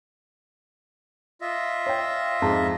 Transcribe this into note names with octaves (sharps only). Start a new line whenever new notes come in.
F4 D#5 E5
C#5 G5
F2 G#2 A5